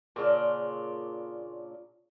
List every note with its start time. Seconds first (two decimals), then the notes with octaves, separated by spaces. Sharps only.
0.16 A#2 C#3 D4 F4